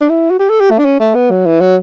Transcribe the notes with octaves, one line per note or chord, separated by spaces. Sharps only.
D4
E4
F#4
G4
A4
G4
A3
D4
C#4
A3
B3
F#3
E3
F#3